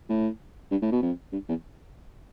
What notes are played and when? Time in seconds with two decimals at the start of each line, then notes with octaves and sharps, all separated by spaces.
0.09 A2
0.71 G2
0.82 A2
0.92 B2
1.02 F2
1.32 G2
1.49 E2